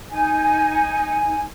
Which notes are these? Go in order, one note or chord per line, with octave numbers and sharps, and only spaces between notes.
D#4 G#5